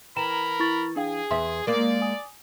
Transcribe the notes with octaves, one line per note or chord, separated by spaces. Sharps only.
E3 A#4 G5 A#5 B5 E7
E4 C#6 A6
D4 G#4 F5 G5
E2 E5 C6
G#3 A#3 A#4 D5
G#5 D#6